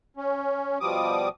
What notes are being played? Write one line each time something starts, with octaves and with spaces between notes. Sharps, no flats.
C#4
B2 F3 G3 D6 D#6